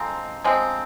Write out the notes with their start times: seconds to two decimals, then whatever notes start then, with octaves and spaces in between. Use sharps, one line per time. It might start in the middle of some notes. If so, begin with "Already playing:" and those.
Already playing: F3 G#3 C4 A#5 C6
0.44 F3 G#3 C4